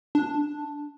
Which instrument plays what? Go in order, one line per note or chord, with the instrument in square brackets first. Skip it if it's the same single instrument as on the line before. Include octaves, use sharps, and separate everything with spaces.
[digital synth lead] D4